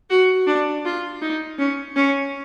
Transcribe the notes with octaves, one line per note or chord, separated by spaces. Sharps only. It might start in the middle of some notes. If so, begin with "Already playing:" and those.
F#4
D4
F4
D#4
C#4
C#4